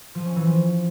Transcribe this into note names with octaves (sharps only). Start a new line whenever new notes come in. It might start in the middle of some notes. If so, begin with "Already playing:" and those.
F3
C#4
E3
F3